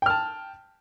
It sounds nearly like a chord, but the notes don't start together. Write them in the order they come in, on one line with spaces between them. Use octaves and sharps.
G5 F6 A5